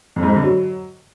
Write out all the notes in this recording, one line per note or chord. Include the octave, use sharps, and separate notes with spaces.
F2
G#2
G2
D3
F#3